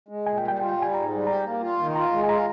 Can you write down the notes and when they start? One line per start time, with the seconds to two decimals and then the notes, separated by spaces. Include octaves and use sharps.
0.08 G#3
0.26 A#2 G#5
0.38 G5
0.43 G3
0.48 G5
0.59 F4 G5
0.72 G5
0.77 G3
0.82 G#5
0.94 G#2 A#5
1.11 G3
1.27 G4 A#5
1.44 A#3
1.61 F4
1.78 D#3
1.96 F4 A#5
2.12 G#3
2.24 G#5
2.28 F4 A#5